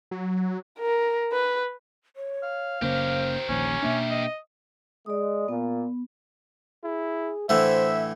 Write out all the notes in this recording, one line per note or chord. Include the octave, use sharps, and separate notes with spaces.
F#3
A#4
B4
C#5
F5
F#1 C#3 A#3 G4 A#4 C5
D#1 A#1 D#2 C#4
B2 A#3 D4 E5
D#5
G#3 D5 D#6
A#2 B3
E4 G#4
A2 D3 E3 C5 E5